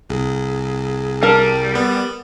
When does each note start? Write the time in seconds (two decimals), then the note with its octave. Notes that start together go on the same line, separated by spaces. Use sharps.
0.10 C2 G#4
1.23 G3 A#4 A5
1.75 B3